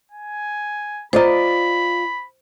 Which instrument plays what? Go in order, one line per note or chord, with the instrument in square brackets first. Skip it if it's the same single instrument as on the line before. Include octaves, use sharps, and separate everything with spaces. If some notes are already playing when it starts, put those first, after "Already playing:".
[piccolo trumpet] G#5
[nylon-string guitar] F4 D5 D#5 [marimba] C5 A#5 [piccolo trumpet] B5